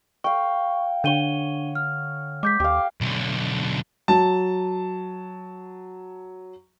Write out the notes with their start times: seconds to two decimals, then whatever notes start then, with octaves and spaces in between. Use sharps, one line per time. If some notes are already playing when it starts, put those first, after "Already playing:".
0.24 F5 G5 C#6
1.04 D3 D4 C#5 F#5 D#7 G7
1.75 F6
2.43 G#3 D6 G6 B6
2.60 D#2 G4 F5 D6
3.01 B1 D3
4.08 F#3 A5